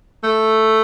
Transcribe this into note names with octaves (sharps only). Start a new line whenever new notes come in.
A3